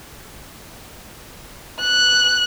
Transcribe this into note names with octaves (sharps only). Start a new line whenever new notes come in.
F#6